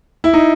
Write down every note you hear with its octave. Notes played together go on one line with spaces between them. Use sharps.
E4
D#4